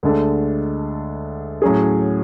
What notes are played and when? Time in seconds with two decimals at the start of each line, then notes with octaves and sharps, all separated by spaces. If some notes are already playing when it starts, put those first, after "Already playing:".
0.03 D2 D3 G#3 D4 A4
1.62 A2 F#3 C#4 G#4